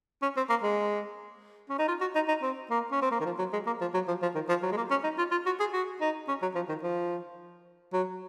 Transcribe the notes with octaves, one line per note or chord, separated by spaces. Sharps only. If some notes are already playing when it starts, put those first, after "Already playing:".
C#4
C4
A#3
G#3
C#4
D#4
F4
F#4
D#4
D#4
C4
A#3
C#4
C4
A#3
D#3
F3
F#3
G#3
A#3
F3
F#3
F3
F3
D#3
F3
F#3
G#3
A#3
C#4
D#4
F4
F4
F#4
G#4
F#4
D#4
C#4
F#3
F3
D#3
F3
F#3